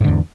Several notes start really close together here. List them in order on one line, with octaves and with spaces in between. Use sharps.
G#2 D3 E2